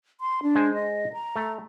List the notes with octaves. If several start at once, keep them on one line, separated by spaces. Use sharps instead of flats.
C6
D4
G#3 C5 G#5
D#5
A#5
A3